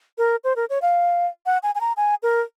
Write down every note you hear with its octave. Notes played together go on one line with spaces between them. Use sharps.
A#4
C5
A#4
C#5
F5
F#5
G#5
G#5
A#5
G#5
A#4